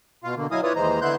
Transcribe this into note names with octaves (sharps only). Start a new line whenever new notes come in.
B2 F4 F5
B2 D3 A#3
F#3 E4 D#5 F5 G#5 D#6
E4 F4 B4 C#5 D5 D#6
D#2 E3 G#3 C5 D#5 A#5
D3 B3 E4 C6 F#6 G6